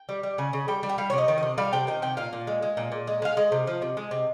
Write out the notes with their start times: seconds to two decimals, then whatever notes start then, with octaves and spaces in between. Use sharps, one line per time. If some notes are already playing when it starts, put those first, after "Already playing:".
Already playing: G5
0.09 G3
0.23 G3
0.38 C#3 G#5
0.53 C#3
0.68 G3 G5
0.83 G3
0.89 G5
0.98 G3 F5
1.10 C3 C#5
1.18 D#5
1.28 D#3
1.38 C3 D#5
1.58 G3 F5
1.73 C3 G5
1.87 D#3 G5
2.02 C3 G5
2.17 A#2 F5
2.33 A#2
2.47 G#3
2.62 G#3
2.77 A#2
2.92 A#2
3.07 G#3
3.22 G#3 F5
3.37 G#3 D#5
3.52 C3
3.67 F3
3.82 C3
3.97 G#3
4.11 C3